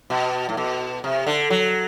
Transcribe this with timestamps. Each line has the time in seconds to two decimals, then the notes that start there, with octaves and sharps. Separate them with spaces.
0.10 B2
0.49 A2
0.57 B2
1.04 C3
1.27 D3
1.50 F#3